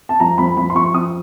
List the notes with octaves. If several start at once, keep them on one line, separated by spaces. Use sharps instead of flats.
A5
F2 A#5
F2 B5
F2 B5
C6
F2 C#6
F2 D#6